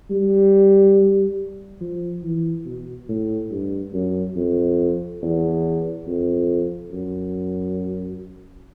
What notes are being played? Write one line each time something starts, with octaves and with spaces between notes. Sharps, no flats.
G3
F3
E3
B2
A2
G2
F#2
F2
E2
F2
F#2